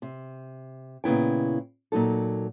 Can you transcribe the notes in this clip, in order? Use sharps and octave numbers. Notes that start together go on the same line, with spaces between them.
C3
A#2 C#3 B3 E4 G5
A#2 F#3 D#4 A4